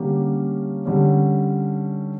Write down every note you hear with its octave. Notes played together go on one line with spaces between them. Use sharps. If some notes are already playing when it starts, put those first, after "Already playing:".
Already playing: D3 G3 A#3 C#4 G4
D3 G3 C#4